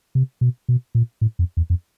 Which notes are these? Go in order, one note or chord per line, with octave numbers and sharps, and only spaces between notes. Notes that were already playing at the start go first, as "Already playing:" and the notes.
C3
B2
B2
A#2
A2
F2
E2
F2